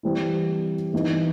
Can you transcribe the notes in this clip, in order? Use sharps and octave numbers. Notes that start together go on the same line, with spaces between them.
E3 G3 C4 E4
E3 B3 D#4